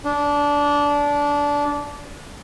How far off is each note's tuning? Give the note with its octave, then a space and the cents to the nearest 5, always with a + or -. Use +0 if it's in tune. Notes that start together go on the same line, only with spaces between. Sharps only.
D4 -20